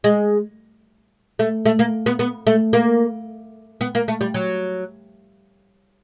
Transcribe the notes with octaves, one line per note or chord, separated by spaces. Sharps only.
G#3
A3
A3
A#3
B3
B3
A3
A#3
B3
A#3
A3
G3
F#3